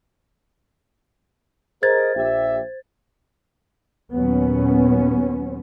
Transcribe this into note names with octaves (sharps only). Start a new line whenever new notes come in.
G#4 A#4 C5 D#5 G#6 A6
A#1 G4 E5
D#2 A#2 F#3 B3 C#4